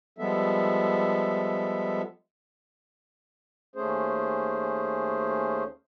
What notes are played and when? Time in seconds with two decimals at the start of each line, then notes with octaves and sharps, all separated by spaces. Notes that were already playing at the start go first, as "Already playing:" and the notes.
0.18 F3 G3 G#3 B3 A4 E5
3.76 D#2 A3 C#4 G#4 C5